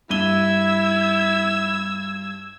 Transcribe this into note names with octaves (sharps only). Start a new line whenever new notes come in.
G2 E4 E6 G#6 D#7 G7